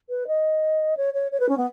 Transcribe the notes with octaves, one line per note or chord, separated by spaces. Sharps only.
B4
D#5
C#5
C#5
C#5
B4
C#4
B3